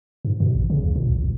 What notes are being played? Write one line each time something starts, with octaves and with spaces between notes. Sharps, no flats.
G2
B2
A1
C#3
C#2
A#2
B1
C2